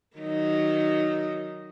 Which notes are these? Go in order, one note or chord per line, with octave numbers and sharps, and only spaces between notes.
D#3 F#3 D#4